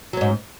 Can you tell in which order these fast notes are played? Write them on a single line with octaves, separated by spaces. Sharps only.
F#3 C#4 G#2